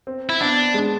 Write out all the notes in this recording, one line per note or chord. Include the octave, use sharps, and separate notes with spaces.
C4
E4
B3 D4
G#3